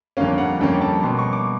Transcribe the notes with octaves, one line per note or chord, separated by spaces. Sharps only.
F2 D3 G3 A#3 C#4 F5
F#5
F2 D3 G3 A#3 C#4 G5
A5
B2 G3 A#3 C6
C#6
D6